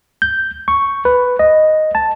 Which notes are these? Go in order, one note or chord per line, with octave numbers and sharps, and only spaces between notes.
G6
C#6
B4
D#5
A5